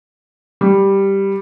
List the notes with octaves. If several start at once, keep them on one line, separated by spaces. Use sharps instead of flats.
G3